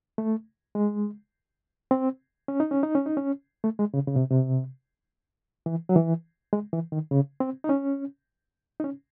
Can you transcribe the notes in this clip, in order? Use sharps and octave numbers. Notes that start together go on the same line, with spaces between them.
A3
G#3
C4
C#4
D#4
C#4
D#4
C#4
D#4
C#4
A3
G#3
C#3
C#3
C3
C3
E3
F#3
E3
G#3
E3
D#3
C#3
C4
D#4
C#4
D#4
C#4